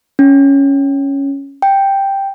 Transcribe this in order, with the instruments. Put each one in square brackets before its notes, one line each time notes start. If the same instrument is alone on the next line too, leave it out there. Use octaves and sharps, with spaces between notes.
[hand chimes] C#4
G5